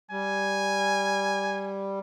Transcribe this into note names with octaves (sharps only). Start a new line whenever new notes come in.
G3 G#5